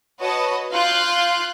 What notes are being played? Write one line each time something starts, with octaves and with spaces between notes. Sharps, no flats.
F#4 B4 C#5 D#5 A5 D#6
F4 F5 F#6 G6